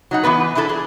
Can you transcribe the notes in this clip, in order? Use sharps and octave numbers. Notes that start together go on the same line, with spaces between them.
F#3 D#4 F#5
E3 F3 B3 B4
E3 D4 E4 A4 B4
G#4